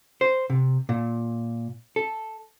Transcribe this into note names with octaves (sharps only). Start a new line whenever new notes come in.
C5
C3
A#2
A4